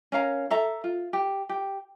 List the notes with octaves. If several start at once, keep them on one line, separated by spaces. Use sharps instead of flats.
C#4 A#4 F5 A#5
A4 E5 A#5
F4
G4
G4